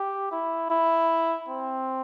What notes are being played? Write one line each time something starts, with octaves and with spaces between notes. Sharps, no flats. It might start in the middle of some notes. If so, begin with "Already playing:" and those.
Already playing: G4
E4
E4
C4